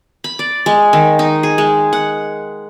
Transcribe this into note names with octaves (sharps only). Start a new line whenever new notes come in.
B5
D5
G#3
D#3
D#4
G#4
G#3
F#5